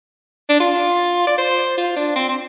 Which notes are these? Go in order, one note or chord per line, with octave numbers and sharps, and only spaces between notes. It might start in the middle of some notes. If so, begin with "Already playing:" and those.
D4
F4
D5
C5
F4
D4
C4
C4